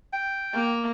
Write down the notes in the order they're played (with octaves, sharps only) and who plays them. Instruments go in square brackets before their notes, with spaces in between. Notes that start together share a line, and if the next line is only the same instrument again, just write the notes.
[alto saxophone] G5
[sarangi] A#3